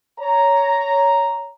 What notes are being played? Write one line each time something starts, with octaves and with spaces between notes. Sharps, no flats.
C#5 A#5